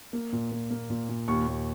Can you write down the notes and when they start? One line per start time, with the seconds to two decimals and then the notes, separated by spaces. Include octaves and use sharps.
0.13 A#3
0.32 A#2
0.51 A#2
0.70 A#3
0.90 A#2
1.09 A#2
1.28 D#2 C#6
1.47 D#2